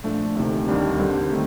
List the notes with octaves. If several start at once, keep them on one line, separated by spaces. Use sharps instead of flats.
A#2 F3 A3 D4
D2 C3 D#3
D#2 D#3 G3 D4 G4
D3 G3 C4 G4
D#3 A3